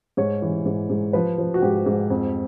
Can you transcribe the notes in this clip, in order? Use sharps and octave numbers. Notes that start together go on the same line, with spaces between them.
G#2 C#5
E3
G#2
G#2
F3 B4
F3
F#4
G#2 G4
G#2
F2